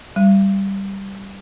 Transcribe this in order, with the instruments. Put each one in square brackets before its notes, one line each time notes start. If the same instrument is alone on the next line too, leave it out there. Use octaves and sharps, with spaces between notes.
[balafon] G3